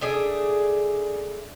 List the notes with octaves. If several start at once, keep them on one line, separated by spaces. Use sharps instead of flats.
A3 D4 G#4